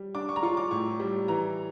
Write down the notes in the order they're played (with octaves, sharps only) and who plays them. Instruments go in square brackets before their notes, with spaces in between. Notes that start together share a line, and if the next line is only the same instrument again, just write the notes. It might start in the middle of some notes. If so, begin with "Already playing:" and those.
Already playing: [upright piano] G3
D4 D6
C#6
A#5
F4 C#6
D6
A2 C#6
G3
E3 A#5